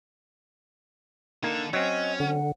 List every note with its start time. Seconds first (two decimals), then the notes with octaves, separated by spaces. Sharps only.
1.43 D3 A#3 D#4 A4
1.73 F#3 C4 C#4 D#5
2.20 D3 F#5